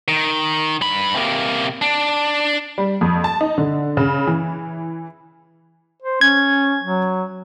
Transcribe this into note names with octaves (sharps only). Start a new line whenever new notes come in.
D#3
G2 B5
C3 A#3
D4
G3
F2
A5
D#4
D3
C#3
E3
C5
C#4 G#6
F#3